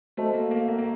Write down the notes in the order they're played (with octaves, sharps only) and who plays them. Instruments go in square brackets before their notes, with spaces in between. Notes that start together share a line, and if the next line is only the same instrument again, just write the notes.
[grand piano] A3 [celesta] F#4 C5 D#5 A5
[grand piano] A#3
A#3
A#3
A#3